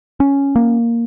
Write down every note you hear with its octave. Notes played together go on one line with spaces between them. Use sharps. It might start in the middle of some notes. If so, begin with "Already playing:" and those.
C#4
A#3